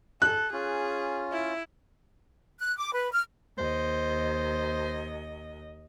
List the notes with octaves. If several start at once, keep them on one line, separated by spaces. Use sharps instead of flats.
A4 F#6
C#4 F4 G#4
E4
F#6
D6
B4
F6
D#2 C5 D#5